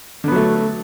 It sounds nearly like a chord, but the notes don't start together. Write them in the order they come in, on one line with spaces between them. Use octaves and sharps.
D3 B3 F#3 A3